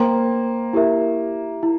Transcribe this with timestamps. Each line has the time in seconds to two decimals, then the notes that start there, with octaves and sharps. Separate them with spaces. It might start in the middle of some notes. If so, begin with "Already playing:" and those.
Already playing: A#3 C5 G5 C6
0.73 E4 G4 A#4 E5
1.63 E4